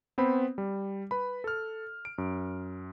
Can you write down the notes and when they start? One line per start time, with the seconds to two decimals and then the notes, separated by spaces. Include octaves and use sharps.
0.18 B3 C4 C5 B5
0.58 G3
1.11 B4 B5
1.44 A4 F6
2.05 D7
2.18 F#2